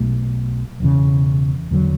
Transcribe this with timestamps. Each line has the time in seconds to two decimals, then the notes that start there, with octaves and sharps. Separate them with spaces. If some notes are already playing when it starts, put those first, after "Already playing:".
Already playing: B1 B2 A3
0.80 E1 E2 C#3
1.71 E2 D3 F#3